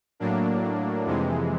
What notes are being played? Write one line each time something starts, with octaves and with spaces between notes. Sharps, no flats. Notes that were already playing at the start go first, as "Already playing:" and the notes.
A2 F#3 A#3 D4
F2 C3 E3 G#3